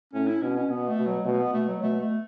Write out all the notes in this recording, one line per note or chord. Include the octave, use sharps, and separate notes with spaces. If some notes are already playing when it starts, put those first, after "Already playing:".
A2 C#4
E4
B2 C#4
C#4
B2 B3
A3
B2
F#3
B2 A3
B3
B2 A3
F#3
B2 A3
A3